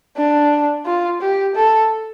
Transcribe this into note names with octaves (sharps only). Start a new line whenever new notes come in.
D4
F4
G4
A4